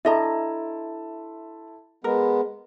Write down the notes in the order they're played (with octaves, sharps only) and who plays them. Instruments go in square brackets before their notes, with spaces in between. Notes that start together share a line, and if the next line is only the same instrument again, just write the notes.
[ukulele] D4 D#5 A#5 [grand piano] E4 A5 C6 [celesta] A4 E5
[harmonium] G#3 B3 [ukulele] A#4